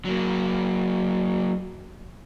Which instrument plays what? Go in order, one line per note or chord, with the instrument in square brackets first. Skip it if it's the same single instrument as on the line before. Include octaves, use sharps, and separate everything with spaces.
[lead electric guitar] F#3 A#3